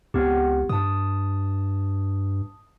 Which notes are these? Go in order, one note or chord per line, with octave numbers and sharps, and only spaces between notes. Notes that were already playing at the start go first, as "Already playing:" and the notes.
C#2 B3 C4 G4
G2 A5 D#6